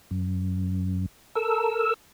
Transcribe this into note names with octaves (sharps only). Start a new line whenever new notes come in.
F#2
A4 A#4 E6